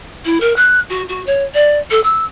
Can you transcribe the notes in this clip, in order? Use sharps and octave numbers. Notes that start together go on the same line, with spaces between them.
E4
A#4
F#6
F#4
F#4
C#5
D5
A4
E6